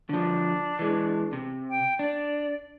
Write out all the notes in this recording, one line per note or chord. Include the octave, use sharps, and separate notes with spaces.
D3 F3 D4
E3 G#3
C3
G5
D4 D5